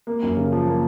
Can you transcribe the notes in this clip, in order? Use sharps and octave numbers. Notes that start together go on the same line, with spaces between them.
A#3
F#2
C#3
F3
A#3